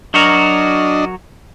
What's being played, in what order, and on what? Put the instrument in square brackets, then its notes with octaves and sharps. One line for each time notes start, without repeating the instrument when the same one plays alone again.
[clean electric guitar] F#3 F#4 A#4 [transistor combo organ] D4 D#5